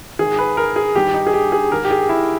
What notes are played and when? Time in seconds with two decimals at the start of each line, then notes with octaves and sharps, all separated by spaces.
0.19 G#2 D#3 G#4
0.39 B4
0.57 A#4
0.76 G#4
0.95 G2 D#3 G4
1.14 D#4
1.27 G#4
1.33 G4
1.52 G#4
1.72 G#2 D#3 A#4
1.85 G4
1.91 G#4
2.09 E4